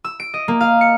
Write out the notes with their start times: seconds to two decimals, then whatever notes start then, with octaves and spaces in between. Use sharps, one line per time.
0.04 E6
0.20 D7
0.34 D#5
0.48 A#3
0.61 F5
0.81 C#7